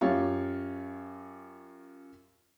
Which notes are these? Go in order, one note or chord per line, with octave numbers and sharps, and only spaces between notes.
F#2 F4 G4 C#5